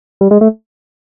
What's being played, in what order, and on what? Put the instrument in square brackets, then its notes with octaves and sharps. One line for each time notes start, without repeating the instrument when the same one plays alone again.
[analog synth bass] G3
G#3
A3